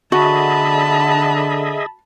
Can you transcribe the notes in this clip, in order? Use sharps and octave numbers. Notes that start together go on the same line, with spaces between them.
D3 F#4 G#4 D#5 E5 A5 B5